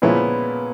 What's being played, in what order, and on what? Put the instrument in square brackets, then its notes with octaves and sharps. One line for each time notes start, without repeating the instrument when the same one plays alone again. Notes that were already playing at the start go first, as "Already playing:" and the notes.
[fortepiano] A#2 F3 G#3 C#4 E4 [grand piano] B3